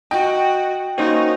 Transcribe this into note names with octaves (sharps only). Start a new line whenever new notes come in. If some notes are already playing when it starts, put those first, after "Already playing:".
F#4 D#5 G5
A#3 C#4 D#4 F#4 C5 D#5 C#6